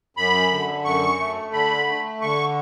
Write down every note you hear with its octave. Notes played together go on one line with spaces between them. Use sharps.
F#2 B5
D3
F#2 C#6
A3
D3 B5
A3
D3 C#6